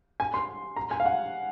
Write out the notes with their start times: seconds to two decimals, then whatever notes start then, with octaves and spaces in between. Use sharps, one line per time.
0.20 G#5
0.34 C6
0.76 A#5
0.91 G#5
1.00 F5
1.06 F#5